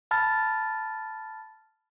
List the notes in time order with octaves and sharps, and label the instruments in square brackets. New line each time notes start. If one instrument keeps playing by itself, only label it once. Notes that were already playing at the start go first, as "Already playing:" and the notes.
[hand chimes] A5 B5 F6 A6